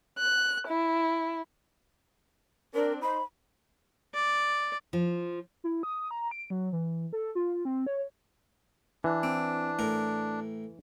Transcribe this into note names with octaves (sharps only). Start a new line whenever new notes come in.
F#6
E4
C4 D4 A#4
D#4 C5 B5
D5
F3
E4
D#6
A#5
D7
F#3
E3
A4
F4
C4
C#5
E3 D4
C4
A2 A#4